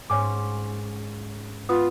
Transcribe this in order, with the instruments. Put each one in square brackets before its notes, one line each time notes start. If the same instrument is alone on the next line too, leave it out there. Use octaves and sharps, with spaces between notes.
[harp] G#2 C#4 [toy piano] C#5 G#5 D6
[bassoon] B3 [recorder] F4 [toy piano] D#6